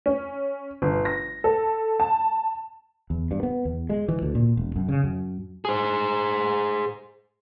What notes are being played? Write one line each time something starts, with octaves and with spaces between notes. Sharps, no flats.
C#4
G1
A#6
A4
A5
E2
G2
B3
E2
G#3
E3
D2
A#2
E1
F#2
C#3
F#2
G#4 C5